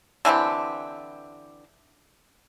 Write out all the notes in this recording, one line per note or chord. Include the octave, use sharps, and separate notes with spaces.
D3 E3 C4 G4